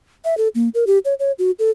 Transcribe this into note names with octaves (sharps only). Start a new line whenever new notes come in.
E5
A4
A#3
A#4
G4
C#5
C#5
F#4
A4